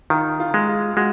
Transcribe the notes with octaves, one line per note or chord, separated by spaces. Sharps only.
D#3 F4
F4
G#3
F4
G#3 F#4